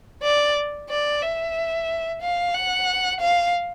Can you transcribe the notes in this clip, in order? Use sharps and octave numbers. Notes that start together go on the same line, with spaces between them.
D5
D5
E5
F5
F#5
F5